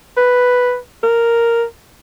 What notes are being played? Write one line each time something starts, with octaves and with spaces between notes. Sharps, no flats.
B4
A#4